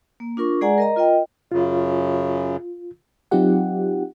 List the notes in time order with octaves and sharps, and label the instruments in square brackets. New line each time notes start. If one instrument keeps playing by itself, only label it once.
[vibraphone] A#3
D4 F4 A#4 C#6
G#3 G#4 D5 F#5 G#5 A#5
A#4 D#5 A#5
F4 A#4 D#5 G5
[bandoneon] F#2 C#3 [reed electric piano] F4
[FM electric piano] F#3 C4 D#4 F4 G4 F#5